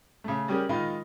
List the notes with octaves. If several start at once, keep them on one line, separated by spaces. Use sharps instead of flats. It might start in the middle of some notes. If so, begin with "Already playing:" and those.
C#3 A3
G3 C#4 G4 G#4 A#4
D#3 G#3 D#4 F4 D#5 B5